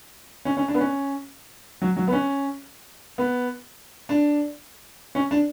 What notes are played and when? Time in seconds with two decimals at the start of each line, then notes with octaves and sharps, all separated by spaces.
0.45 C#4
0.57 C#4
0.68 D4
0.75 B3
0.80 C#4
1.82 F#3
1.96 F#3
2.08 B3
2.12 C#4
3.18 B3
4.09 D4
5.15 C#4
5.31 D4